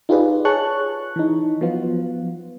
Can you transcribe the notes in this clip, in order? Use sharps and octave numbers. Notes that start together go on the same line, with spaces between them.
D#4 F4 G4 G#4 B4 D5
G#4 C#5 A5 C#6 F#6
E3 D#4
F3 F#3 B3 F4